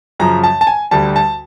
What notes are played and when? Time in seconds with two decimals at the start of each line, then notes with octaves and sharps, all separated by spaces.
0.20 F#2 C#3 F3 A#5
0.44 A5
0.61 A5
0.67 G#5
0.91 D2 D3 G3 A5
1.16 A5